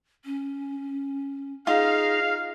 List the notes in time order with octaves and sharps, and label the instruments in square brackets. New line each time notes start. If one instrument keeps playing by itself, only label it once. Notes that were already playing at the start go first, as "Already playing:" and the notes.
[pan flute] C#4
[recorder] D#4 [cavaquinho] F4 [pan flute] G#4 [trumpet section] F5